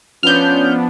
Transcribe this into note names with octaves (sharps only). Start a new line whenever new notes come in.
F3 B3 C#4 D4 F6 G6